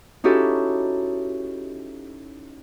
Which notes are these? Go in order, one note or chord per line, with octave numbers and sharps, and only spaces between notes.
C#4 D#4 E4 F#4 G4 A4